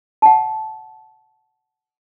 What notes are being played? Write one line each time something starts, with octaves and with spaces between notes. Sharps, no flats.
F#5 A5